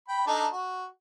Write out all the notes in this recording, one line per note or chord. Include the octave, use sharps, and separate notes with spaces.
G5 B5
D4 D#4 A4
F#4